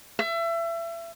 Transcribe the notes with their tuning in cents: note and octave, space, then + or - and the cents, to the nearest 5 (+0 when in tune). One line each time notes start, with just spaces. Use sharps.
E5 +30